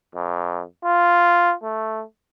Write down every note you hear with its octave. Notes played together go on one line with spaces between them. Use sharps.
F2
F4
A3